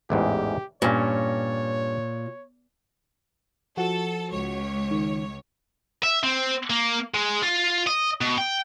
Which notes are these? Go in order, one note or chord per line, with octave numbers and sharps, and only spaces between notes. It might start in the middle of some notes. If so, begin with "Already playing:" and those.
A1 E2 G#2 G4
G2 A#2 C#4 C#5
F3 F#4 A4
C#2 C#5
D#3
E5
C4
A#3
G#3
F4
D#5
B2
G5